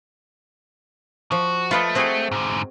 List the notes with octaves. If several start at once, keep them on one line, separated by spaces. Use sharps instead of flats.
F3 F#4
A3 F4 B4 D#5
C4 F#4 G#4
G#2 D3